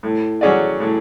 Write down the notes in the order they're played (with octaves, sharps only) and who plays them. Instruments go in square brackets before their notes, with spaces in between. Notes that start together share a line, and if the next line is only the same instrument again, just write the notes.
[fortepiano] A2
F#3 C#4 G#4 D5
A2